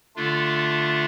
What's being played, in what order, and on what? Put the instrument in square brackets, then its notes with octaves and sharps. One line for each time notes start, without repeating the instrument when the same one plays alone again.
[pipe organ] D3 A3 D4 F4